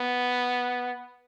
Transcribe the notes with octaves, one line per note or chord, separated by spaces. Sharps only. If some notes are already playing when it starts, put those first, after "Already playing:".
Already playing: B3